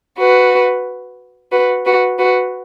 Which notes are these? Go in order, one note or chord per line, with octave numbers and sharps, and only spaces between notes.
F#4 B4
F#4 B4
F#4 B4
F#4 B4